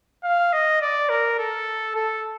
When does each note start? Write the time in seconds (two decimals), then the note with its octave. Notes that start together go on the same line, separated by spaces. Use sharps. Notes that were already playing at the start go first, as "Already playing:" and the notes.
0.24 F5
0.53 D#5
0.82 D5
1.10 A#4
1.39 A4
1.96 A4